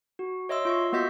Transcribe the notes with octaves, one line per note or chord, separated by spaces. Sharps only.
F#4
C#5 D#5 E5 C6 E6
F4 C6 C#6
A#3 B3 F#4 D#5 G6 B6